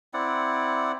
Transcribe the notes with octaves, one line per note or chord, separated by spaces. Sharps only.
C4 E4 D5 F#5